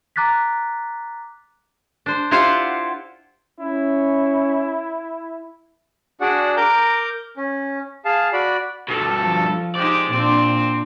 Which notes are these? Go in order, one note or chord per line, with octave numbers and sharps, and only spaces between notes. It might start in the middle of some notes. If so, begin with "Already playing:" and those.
A#5 D6 F#6 A6 B6
D4 C5
E4 F4 G4 C5 F5 F#5
C#4 E4
D4 F#4 G#4 D5 F#5
A#4 A#5 D6 G6
C#4
G#4 F5 A5
F#4 D5 B5
G2 B2 A4
F3
G#3 D#4 G4 C5 D5
A#2 C4 D4